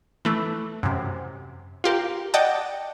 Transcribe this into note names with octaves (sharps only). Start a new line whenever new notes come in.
E3 A3
F#2 C3
F4 G4 A#4
D5 D#5 F#5 G5 A5